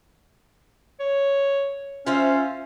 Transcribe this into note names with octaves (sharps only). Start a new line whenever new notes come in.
C#5
C#4 F4 C5 E5